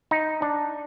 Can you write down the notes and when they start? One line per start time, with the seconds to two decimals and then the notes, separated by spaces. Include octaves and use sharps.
0.11 D#4
0.42 D4